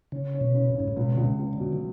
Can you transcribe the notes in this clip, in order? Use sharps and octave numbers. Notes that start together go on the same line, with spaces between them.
C#3 C#4
C#4
B2
C#3
G#2 C#3
A2
C#2 B2
C#2 D3
C#3
C#2
D3
B2
F3